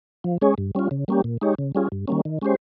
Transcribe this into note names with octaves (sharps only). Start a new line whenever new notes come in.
F3
G#3 C#4 G#4 C#5
G2
G3 C#4 F4
C#3
G3 A#3 C#4 G4
A#2
G#3 D#4 G4 C#5
C#3
G3 C#4 F4 G#4
G2
D#3 G3 A#3 C#4
D#3
G#3 C#4 G4 C5